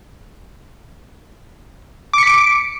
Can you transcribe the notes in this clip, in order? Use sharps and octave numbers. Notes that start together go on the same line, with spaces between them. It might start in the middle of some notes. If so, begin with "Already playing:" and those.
D6 B6 C#7 D7